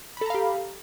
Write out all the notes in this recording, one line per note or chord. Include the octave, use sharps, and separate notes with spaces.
G4 A4 F5 A#5 B5